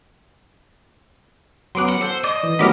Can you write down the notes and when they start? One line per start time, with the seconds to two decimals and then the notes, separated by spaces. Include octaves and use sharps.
1.75 F#3 B3 C#4 C6 D6 F#6
1.89 F#5
2.02 A4 C5
2.24 D5 D#5
2.43 E3
2.59 D#3 F#3 G3 A3 B3 B5 D6 F6